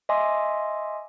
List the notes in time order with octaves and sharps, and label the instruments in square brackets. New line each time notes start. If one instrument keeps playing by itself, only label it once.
[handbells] D#5 E5 G#5 C6 D6